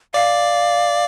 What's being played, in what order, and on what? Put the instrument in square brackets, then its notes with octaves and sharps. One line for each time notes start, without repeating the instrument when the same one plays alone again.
[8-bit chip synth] D5 [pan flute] F5